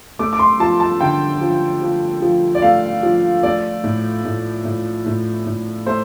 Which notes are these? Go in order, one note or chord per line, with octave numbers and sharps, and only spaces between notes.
A3 D6
D6
C6
F3 A5
A5
D3 G5
F3
F3
F3
D5
A3 F5
F3
A3 D5
A2
A2
A2
A2
A2
A3 C5